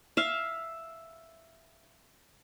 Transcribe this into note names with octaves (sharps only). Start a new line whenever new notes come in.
E5 F5